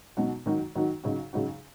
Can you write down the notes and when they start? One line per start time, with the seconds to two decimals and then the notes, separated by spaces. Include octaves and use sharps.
0.17 B2 F#3 D#4 F#4
0.46 D#3 F#3 D#4 F#4
0.76 D#3 F#3 D#4 F#4
1.04 C#3 F#3 D#4 F#4
1.33 C#3 F#3 D#4 F#4